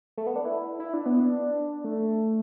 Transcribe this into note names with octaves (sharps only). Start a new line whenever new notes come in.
A3
B3
D4
E4
E4
D4
B3
D4
A3